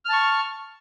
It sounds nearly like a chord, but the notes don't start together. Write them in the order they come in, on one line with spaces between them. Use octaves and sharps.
F6 A5 C#6